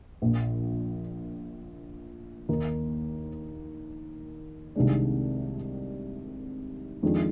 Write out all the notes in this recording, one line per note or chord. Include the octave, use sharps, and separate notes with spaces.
A#1 A#2 F3
D#2 D#3 A#3 D#4
C2 C3 D#3 G#3 D4
F2 D#3 G#3 D4 F4